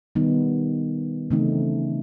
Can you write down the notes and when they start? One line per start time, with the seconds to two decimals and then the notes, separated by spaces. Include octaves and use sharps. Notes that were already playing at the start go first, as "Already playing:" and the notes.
0.15 D#3 G3 B3 D#4
1.31 C#3 E3 A3 C4 D#4